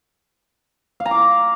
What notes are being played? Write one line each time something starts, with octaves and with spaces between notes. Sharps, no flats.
F5
A#5
D6